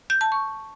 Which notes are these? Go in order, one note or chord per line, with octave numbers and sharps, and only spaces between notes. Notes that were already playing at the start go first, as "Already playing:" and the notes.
G6
A5
C#6